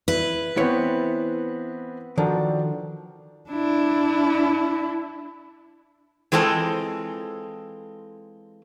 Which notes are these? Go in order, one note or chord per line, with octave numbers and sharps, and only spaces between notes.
E4 B4
E3 B3 C4 E4 C#5
D#3 F3 D4 F#4 A4
D4 E4
E3 G#3 C4 F4 A4